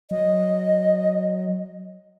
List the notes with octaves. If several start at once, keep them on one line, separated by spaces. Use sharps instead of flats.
F#3 D#5